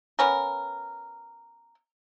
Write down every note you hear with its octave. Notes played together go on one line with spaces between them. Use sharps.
B3 C#4 A#4